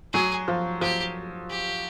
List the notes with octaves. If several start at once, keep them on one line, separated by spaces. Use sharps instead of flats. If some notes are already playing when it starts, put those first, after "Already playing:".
F#3 G#4
F3
F3 G4
G4